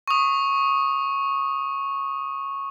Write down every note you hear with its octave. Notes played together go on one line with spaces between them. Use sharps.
C#6 D#6